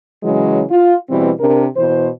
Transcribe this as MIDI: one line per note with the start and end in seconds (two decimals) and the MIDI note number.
0.23 0.63 49
0.23 0.63 52
0.23 0.63 54
0.23 0.63 56
0.71 0.95 65
1.09 1.31 47
1.09 1.31 52
1.09 1.31 55
1.09 1.31 60
1.40 1.66 48
1.40 1.66 62
1.40 1.66 70
1.77 2.09 47
1.77 2.09 52
1.77 2.09 72